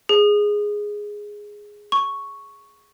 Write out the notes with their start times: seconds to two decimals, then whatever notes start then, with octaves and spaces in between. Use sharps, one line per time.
0.09 G#4
1.92 C#6